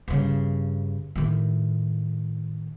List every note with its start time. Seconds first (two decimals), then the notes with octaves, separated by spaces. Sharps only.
0.08 G2 C#3
1.16 A2 D#3